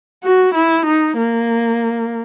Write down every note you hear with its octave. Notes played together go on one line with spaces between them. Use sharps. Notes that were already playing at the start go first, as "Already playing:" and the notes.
F#4
E4
D#4
A#3